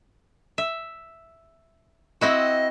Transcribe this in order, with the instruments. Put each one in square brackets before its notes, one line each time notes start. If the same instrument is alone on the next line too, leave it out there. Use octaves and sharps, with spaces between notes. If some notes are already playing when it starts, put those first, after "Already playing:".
[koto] E5
[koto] C4 E4 F#4 [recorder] D#5